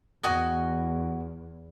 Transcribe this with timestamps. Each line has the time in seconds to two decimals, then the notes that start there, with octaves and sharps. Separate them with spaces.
0.23 E2 F#4 D#5 G#5